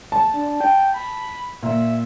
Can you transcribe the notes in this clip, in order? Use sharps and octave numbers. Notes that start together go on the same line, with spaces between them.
A5
D4
G5
B5
A#2 E5